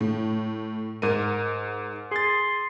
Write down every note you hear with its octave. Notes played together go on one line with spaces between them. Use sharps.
A2
G#2 A#4 D#7
G#4 C6 A6